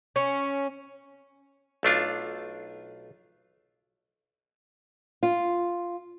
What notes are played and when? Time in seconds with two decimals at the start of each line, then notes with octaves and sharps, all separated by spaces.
0.16 C#4
1.83 B1 A3 D4 F4
5.23 F4